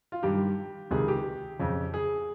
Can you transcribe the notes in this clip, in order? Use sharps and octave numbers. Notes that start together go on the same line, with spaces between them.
F4
G2 D#3 G4
C#2 C3 D#3 G#4
G4
F2 C#3
G#4